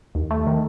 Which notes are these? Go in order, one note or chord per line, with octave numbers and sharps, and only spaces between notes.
D#2
A3
D#3